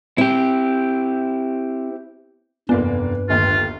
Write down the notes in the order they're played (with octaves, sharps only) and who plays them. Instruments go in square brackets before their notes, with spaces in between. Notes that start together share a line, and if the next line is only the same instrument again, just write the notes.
[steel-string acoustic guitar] C4 [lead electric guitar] E4 G4
[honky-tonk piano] F1 A#3 D5 [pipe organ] G2 B4 [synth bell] B3
[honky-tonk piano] G1 D#2 A2 [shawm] F4